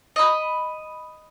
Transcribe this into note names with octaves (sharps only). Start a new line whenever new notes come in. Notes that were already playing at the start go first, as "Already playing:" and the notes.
D#5 B5